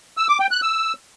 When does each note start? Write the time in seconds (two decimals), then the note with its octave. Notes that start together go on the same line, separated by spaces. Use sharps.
0.17 E6
0.29 D6
0.40 G5
0.51 F#6
0.62 E6